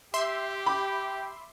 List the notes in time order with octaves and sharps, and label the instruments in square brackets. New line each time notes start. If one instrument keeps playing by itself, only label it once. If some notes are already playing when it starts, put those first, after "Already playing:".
[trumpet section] G4 [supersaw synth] E5 C6
[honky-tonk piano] B5 D6